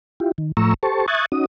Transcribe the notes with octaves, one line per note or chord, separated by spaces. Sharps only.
E4 F4 G4
D#3
A2 F3 A3 A#5 C#6 E6
G4 A4 C5 A5 C#6
E5 C#6 D#6 F#6 G#6 A6
C#4 D#4 F#4 D#6